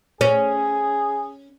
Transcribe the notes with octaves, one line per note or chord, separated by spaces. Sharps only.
C#4 G#4